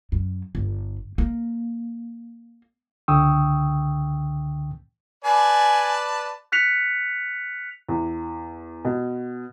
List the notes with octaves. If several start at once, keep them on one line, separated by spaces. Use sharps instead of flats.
F#2
G1
A#3
C#2 D3 G5 C#6 D#6 E6
B4 D5 G#5 A5
F6 F#6 B6 C#7 F7
E2
B2